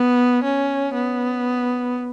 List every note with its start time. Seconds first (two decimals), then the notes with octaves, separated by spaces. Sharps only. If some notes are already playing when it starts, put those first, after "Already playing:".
Already playing: B3
0.44 C#4
0.94 B3